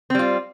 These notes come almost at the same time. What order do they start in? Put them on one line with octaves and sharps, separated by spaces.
C4 G3 F4